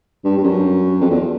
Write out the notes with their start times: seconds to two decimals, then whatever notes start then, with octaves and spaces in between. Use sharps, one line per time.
0.24 G2
0.37 G2
0.43 F#2
1.01 F2
1.10 E2